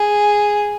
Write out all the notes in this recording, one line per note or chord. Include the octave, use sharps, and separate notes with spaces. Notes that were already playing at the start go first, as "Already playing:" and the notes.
Already playing: G#4